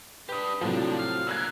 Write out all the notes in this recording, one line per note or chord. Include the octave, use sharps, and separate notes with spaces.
D4 G4 B4 D#6
A2 C3 D#3 F3 F#3 D4
F5
A#2 A#4 E6 F#6 G#6